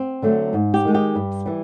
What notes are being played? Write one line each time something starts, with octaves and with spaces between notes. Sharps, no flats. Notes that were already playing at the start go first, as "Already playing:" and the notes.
Already playing: C4
D3 F#3 A3
G#2
G4
D#3 G#3
G4
G2
E3 G3